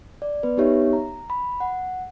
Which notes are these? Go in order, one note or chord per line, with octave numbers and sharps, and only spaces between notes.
D5
B3 B4
B3 D#4 G4 C#5 E5
A#5
B5
F#5